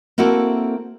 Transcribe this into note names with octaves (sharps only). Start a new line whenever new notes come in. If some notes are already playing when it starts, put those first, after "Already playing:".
A#3 C4 E4 F#4 A4 A#4